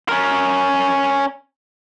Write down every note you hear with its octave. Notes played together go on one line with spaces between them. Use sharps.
C#4 A#4